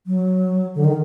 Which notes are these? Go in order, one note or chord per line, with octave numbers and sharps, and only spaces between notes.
F#3
D3
D#3